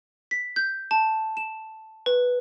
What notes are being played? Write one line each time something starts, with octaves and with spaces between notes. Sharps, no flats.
B6
G6
A5
E7
B4